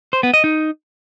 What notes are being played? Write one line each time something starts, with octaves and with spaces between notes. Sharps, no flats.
C5
B3
D#5
D#4